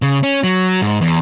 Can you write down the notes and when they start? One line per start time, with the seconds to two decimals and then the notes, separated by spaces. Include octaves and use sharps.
0.02 C#3
0.23 C#4
0.44 F#3
0.82 G#2
1.01 E2